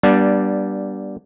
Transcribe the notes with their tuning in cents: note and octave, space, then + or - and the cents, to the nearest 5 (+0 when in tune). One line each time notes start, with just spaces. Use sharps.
G3 -15 B3 -40 D4 +0